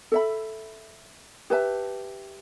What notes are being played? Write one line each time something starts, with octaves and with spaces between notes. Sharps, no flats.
A4 E5 B5
G4 B4 E5 A5